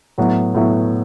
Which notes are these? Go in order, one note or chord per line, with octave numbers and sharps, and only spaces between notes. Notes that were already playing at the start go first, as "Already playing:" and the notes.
A2 F#3 B3
A2 F#3 B3